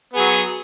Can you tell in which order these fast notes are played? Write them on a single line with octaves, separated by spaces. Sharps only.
B3 G#4 F#3